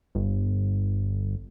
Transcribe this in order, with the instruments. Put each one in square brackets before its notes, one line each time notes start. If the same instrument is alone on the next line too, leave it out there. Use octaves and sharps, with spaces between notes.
[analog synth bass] G1